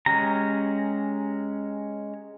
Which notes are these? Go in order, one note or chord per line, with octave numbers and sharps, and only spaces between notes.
G#3 C#4 G4 A#5